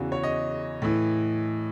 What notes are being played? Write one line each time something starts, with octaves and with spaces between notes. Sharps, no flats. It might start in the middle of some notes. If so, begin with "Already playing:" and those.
Already playing: E2 C#3 E3 F#4
C#5
D#5
A2 E3